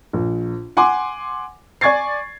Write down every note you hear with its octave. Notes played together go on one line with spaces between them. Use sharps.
A#1
F#5 G#5 C6 D6
D5 G#5 C#6 G#6 A6 C7